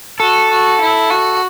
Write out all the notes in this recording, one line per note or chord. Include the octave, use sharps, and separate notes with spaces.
F#4 A4
F#4
E4
F#4